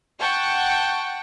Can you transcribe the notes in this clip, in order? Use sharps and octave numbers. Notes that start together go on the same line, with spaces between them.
F#5 G5 A5 C#6